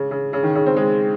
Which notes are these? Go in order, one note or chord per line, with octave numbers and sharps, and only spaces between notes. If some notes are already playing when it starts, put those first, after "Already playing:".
Already playing: C#3
C#3
C#3
D#3
C#3
C4
G#3